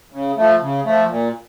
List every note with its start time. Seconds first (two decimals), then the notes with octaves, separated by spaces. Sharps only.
0.12 C#3
0.37 F3 A3
0.61 C#3
0.85 F3 A3
1.09 A#2